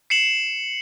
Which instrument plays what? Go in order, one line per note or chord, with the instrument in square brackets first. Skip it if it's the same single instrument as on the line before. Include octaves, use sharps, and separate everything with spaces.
[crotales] C7 C#7 E7 F#7